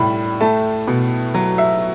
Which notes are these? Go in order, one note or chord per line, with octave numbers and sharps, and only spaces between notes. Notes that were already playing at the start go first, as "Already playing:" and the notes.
Already playing: A2 G3 B5
A3 A5
B2
F#3
E5